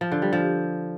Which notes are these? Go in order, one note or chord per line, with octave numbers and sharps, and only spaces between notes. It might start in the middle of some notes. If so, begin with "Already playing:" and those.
F3
D3
G3
F3